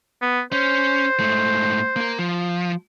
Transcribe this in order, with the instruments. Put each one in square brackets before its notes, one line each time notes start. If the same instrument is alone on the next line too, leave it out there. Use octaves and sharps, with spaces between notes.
[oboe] B3
[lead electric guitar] C#4 [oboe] C5
[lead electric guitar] G#2 A3
A#3 A#4
F3